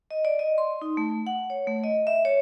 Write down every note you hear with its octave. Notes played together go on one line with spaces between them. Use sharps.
D#5
D5
D#5
C6
D#4
A3
F#5
C#5
A3
D#5
E5
C#5